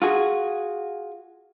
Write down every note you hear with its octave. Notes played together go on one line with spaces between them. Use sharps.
F4 F#4 G#4